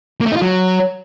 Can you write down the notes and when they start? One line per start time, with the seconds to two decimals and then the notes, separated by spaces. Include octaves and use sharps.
0.21 A#3
0.26 A3
0.31 D#4
0.36 F4
0.42 F#3